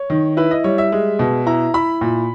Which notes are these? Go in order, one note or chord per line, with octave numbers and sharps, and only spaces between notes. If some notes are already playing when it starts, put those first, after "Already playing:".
Already playing: C#5
D#3
E4 B4
D#5
G3 C#5
E5
G#3
B2
E4 A#5
E4 B5
A#2